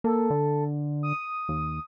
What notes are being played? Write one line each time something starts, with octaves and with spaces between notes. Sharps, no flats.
A#3 A4
D3
D#6
D#2